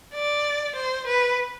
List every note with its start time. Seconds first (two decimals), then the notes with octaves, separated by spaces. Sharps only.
0.15 D5
0.76 C5
1.07 B4